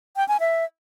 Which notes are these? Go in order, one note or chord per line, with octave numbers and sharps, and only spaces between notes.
G5
G#5
E5